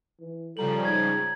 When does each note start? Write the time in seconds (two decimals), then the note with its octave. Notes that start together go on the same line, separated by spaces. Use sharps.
0.20 E3
0.57 C#3 F3 G3 A4 A#5 F#7
0.85 G#2 G#6